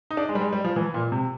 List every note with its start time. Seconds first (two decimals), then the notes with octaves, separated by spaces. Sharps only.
0.11 D#4
0.17 D4
0.29 G#3
0.35 G3
0.41 G#3
0.53 G3
0.64 F3
0.76 E3
0.94 A#2
1.12 C3